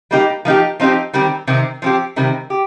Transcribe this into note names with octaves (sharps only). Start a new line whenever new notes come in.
G3 A#3 D#4 G4
F3 A#3 D#4 G4
F3 C4 D#4 G4
D#3 G3 C4 G4
C3 D#3 C4
F3 C4 G4
C3 D#3 G3 C4
G4